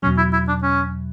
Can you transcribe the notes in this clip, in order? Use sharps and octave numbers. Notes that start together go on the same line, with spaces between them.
E2 B2 F#3 C#4
E4
E4
D4
C#4